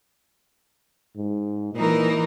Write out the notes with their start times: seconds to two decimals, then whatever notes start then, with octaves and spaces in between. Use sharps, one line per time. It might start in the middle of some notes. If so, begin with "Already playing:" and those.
1.16 G#2
1.74 A#2 E3 D#4 A#4